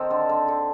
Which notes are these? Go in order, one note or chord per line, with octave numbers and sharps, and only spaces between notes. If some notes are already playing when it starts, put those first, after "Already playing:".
Already playing: D#3 C4 A4 C5
D3
D3
D3